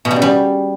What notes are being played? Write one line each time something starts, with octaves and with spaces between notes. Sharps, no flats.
B2
G3
C#3
G3